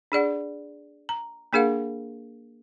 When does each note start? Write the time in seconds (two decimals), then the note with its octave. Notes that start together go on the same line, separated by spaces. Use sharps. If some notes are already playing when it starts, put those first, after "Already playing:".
0.12 D4 G#4 D5 F#5
1.09 A#5
1.53 A#3 D4 G#4 A#4 F5 F#5